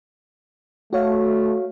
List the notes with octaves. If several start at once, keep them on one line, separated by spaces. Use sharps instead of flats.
A3 F#4 C#5 F5